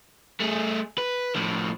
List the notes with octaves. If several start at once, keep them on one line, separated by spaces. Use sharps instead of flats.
A3 G#4
B4
A2 F3